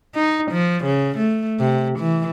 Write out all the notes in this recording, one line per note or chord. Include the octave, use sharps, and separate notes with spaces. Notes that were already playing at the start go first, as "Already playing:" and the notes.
D#4
F3
C#3
A3
C3
E3